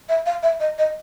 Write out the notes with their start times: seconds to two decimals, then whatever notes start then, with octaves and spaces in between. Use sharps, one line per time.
0.09 E5
0.26 F5
0.43 E5
0.60 D#5
0.78 D#5